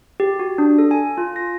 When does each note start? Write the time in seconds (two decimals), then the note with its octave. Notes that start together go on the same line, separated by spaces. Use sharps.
0.20 G4
0.39 F#4
0.58 D4
0.78 A4
0.91 G#5
1.18 F4
1.36 A#6